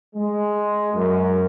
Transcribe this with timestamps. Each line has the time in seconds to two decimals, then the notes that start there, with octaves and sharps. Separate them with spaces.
0.14 G#3
0.93 F#2